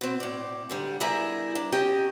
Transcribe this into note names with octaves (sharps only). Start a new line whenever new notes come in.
B2 C4
A2 D5
G#2 D3 G3
G3 B3 E4 G#4 A#4 E5
D4
C#4 G4 D#5 G5